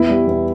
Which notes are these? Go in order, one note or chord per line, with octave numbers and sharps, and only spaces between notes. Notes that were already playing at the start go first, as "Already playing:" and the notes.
Already playing: E2 B3 E4
G3
E2